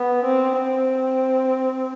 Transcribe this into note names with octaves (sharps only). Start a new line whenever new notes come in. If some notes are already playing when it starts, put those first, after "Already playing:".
Already playing: B3
C4
C4